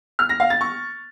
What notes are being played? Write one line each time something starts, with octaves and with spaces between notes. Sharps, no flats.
F6
A#6
F5
A6
C#6